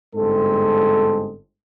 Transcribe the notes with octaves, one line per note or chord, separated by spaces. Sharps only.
G1 G#2 G#3 C4 A4